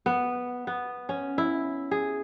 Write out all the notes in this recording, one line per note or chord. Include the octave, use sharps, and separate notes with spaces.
B3
B3
C#4
E4
G#4